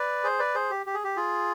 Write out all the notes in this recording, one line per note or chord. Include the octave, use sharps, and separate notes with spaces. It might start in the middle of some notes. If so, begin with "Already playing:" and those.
Already playing: B4 D5
G#4 C5
B4 D5
G#4 C5
G4
G4
G#4
G4
F4 G#4